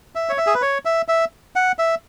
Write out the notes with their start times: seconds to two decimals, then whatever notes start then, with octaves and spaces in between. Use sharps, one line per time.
0.15 E5
0.29 C#5
0.38 E5
0.47 G#4
0.54 B4
0.62 C#5
0.85 E5
1.08 E5
1.56 F#5
1.79 E5